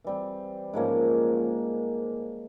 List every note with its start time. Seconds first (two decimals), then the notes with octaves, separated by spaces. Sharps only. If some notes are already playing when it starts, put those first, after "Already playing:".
0.04 E3 G3 C4
0.74 G#2 F3 A#3 C#4